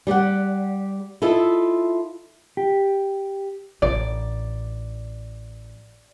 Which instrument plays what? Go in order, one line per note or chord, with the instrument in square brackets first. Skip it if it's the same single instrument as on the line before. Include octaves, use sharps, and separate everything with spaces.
[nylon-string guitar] G3 G4 D5 F#5
E4 F4 A4 D#5 E5
[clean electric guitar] G4
[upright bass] A1 [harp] D5